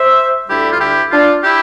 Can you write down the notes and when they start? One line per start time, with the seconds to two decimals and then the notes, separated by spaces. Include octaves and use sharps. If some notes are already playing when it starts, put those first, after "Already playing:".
Already playing: C5 E5
0.48 D2 D3 G3 E4 G4
0.71 F4
0.79 E4 G4
1.11 D4 F4
1.43 E4 G4